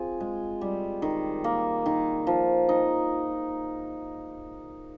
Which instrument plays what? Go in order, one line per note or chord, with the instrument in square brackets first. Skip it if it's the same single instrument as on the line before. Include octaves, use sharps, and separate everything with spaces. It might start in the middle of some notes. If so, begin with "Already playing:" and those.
Already playing: [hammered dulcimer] C4 F4 G#4
G#3
G3
D#3
A#3
D#3
F3
D#4